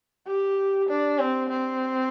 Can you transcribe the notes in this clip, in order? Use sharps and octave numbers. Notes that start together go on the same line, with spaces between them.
G4
D4
C4
C4